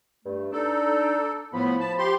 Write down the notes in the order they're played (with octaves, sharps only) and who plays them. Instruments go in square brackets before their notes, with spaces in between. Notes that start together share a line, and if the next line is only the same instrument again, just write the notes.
[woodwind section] G2 A3
[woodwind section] D4 D#4 [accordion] A4
[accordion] A2 B3 [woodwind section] F3 B5
[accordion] A5
G4 C6